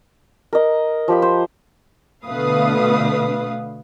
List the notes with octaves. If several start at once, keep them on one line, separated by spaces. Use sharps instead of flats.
A#4 D#5
F3 G4 B5
C5
B2 D3 A3 B4 F5 D#6